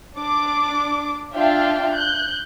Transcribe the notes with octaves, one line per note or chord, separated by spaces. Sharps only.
D4 D6
D4 F4 E5 F5 G5 A5
F#6 G6